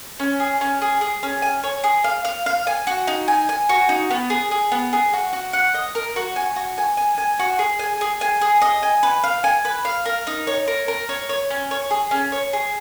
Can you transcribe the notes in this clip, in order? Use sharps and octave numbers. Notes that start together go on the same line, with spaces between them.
C#4
G#4
C#4
G#4
G#4
C#4
G#5
C#5
G#4
F5
F5
F5
G#5
F#4
D#4
G#5
G#5
F#4
D#4
B3
G#4
G#4
B3
G#4
F#4
F#4
F#5
D#5
A#4
F#4
G#5
F#4
G#5
G#5
G#5
F#4
G#4
G#5
G#4
G#5
G#4
D#5
G#5
B4
F5
G#5
B4
F5
A#4
D#4
C#5
A#4
A#4
C#5
C#5
C#4
C#5
G#4
C#4
C#5
G#4